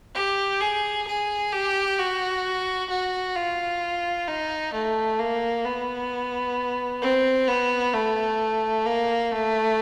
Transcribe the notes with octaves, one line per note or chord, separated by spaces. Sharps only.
G4
G#4
G#4
G4
F#4
F#4
F4
D#4
A3
A#3
B3
C4
B3
A3
A#3
A3